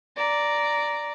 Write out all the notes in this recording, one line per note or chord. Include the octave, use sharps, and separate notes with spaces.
D5 A#5